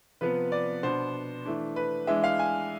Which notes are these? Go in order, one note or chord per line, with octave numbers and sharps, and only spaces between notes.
C3 F3 B3 B4
D5
B2 B3 D4 C5
E3 A3 D4
B4
E3 G#3 D4 E5
F5
G#5